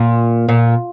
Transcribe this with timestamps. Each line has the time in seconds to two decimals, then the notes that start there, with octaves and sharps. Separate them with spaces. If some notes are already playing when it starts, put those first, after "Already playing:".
Already playing: A#2
0.48 A#2